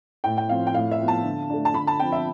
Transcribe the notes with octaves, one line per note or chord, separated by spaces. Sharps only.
A2 G5
G5
F3 C4 F5
G5
A2 F5
E5
F3 B3
A5
D3
A3 D4
A5
D3 B5
A5
F3 C4 G5
E5